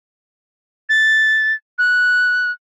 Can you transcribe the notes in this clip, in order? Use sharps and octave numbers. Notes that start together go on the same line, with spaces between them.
A6
F#6